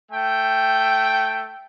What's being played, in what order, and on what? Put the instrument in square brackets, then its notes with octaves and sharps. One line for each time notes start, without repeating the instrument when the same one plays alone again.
[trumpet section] A3 G5